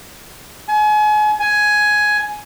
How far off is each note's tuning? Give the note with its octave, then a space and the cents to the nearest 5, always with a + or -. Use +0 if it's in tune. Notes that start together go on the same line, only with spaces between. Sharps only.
G#5 +35
G#5 +10